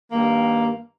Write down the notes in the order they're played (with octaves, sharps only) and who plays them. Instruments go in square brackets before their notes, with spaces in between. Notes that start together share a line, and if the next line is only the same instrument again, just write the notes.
[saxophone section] G2 D#3 A#3